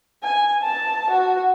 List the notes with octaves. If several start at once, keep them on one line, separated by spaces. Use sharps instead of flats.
G#5
A5
F#4